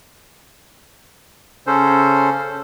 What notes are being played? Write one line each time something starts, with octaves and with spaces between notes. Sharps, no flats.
C#3 C#4 A4 C5